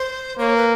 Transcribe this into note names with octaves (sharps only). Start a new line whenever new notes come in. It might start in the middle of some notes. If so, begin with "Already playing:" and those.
Already playing: C5
A#3 C#5
B4